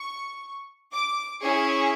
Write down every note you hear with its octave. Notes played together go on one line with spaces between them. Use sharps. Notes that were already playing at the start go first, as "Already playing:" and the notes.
Already playing: C#6
D6
C#4 E4 G#4 C#6